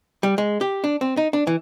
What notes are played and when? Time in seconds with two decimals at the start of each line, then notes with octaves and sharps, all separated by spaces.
0.23 G3
0.38 G#3
0.61 G4
0.84 D4
1.01 C4
1.17 D#4
1.33 D4
1.47 E3